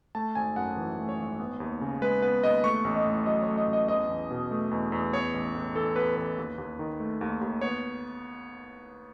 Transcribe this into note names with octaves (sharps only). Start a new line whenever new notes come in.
A3 A5
G#1 G#5
F#2 F#5
E3
A3
C#5
G#1
B3
D#2
C#3
G#3 B4
B3 B4
D#2 D#5
A3 C#6
A1
D#5
A2
F#3 D#5
C#5
A3
D#5
A1
D#5
E2 D#5
E2
B2
A3
E2
E2
B3 C#5
A1
A2
E3 A4
B3 B4
A1 B4
D#2
D#2
D#3
A3
D#2
D#2
B3 C#5